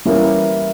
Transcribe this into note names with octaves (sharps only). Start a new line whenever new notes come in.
E3 G3 A#3 C#4 E4